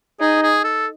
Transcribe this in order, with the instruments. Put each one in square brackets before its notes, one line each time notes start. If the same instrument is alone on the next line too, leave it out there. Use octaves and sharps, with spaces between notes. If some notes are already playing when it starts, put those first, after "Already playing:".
[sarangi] D#4 [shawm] G#4
[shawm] G#4
A4